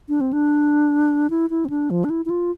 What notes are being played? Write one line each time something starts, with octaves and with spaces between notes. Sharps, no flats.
D4
C4
D4
E4
E4
C4
D4
F3
D4
E4
E4
F4